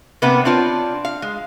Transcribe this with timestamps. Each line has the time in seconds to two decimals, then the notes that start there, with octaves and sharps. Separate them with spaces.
0.22 C3 A#3 B3 D4 B4
0.45 C4 D4 F4 C#5
1.05 F5
1.22 G#3